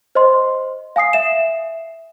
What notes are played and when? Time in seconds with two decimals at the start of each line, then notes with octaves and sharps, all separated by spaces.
0.15 C5 D#5 C6
0.96 F5 G#5 D#6 C7
1.13 E5 E7